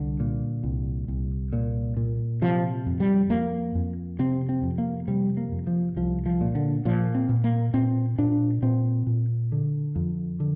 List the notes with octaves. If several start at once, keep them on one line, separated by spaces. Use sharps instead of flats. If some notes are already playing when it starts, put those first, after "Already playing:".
Already playing: C2 D3
A#2
C2
C2
A#2
A#2
C3 F3
F2
G3
F2 A#3
F2
C3 C4
C4
F2
A#3
C3 G3
A#3
F2
F3
C2 F3
F3
A#2
D3
A#2 F3
C4
A#2
A#3
A#2 C4
A#2 D4
A#2 C4
A#2
D3
F2
D3